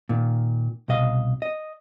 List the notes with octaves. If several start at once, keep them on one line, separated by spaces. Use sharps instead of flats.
A#2 D#3
C2 B2 D#5 F5
D#5